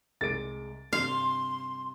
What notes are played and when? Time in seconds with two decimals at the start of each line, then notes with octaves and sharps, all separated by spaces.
0.21 C2 G#3 D6 A6 D7
0.93 G2 C3 D4 F5 C6